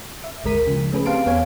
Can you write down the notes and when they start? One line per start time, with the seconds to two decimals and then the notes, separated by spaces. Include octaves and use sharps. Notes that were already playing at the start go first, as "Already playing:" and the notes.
0.24 E5
0.44 G#1 D2 G#3 A#4 B6 D#7
0.67 C#3 F3
0.92 A3 C#4 G#4 B4
1.06 C4 G4 F5 A5 C6 D7
1.26 E2 B3 C#5 F5 G#5